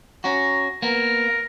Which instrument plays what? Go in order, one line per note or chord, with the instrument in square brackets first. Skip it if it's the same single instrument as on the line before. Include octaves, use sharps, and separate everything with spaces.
[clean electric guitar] C#4 F#4 [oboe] A#5
[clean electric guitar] A#3 B3 [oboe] A#4